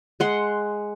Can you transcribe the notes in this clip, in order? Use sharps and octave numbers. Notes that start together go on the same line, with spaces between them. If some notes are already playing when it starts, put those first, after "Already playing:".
G#3 F#5 C6